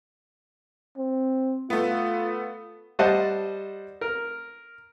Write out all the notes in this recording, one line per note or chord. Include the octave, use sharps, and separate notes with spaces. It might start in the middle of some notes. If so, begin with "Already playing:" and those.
C4
A3 B3 F4
G3 C5 D#5 F#5 A5
A#4